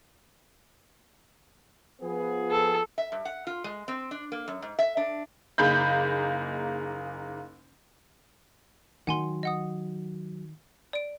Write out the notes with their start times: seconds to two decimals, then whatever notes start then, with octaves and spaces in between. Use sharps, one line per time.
2.02 F3 B3 G#4
2.51 A4
2.98 E5
3.12 G2
3.25 F#5
3.47 F4
3.64 G#3
3.88 C4
4.11 D4
4.32 A#3
4.48 F#2
4.62 G#2
4.79 E5
4.97 D4
5.58 F#1 A#3 D#4 G#4 B5 G6
9.07 D#3 F#3 F#5 G#5 C6
9.43 D#5 F#5 D#6
10.93 D5 D7